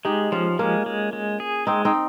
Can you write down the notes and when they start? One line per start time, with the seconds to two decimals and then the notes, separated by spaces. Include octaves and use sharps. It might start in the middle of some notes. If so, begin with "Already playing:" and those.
0.05 G#3 D#4 G4
0.32 F3 C#4 F4
0.59 G#3 A#3 C#4
0.86 G#3
1.13 G#3
1.40 G#4
1.67 G#3 C4 D#4
1.85 C4 D#4